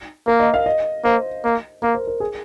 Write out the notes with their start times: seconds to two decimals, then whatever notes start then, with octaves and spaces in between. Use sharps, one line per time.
0.27 A#3 A#4
0.40 D#5
0.54 F5
0.66 D#5
1.04 A#3 C5
1.44 A#3
1.82 A#3 A#4
1.94 C5
2.07 A#4
2.20 G#4